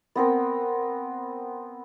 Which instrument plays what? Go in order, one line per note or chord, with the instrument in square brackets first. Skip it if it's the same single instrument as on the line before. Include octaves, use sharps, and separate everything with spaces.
[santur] B3 C4 A#4